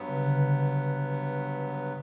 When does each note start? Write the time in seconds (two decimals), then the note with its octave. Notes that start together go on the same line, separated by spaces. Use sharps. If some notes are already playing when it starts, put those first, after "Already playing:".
Already playing: G2 F#3 B3
0.09 C#3
0.17 D3
0.27 C#3